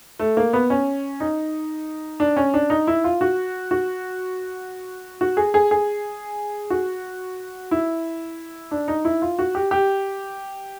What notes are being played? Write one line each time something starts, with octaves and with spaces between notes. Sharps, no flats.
A3
A#3
B3
C#4
D#4
D4
C#4
D4
D#4
E4
F4
F#4
F#4
F#4
G#4
G#4
G#4
F#4
E4
D4
D#4
E4
F4
F#4
G4
G4